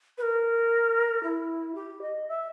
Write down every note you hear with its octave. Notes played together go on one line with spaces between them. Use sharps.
B4
A#4
E4
G4
D#5
E5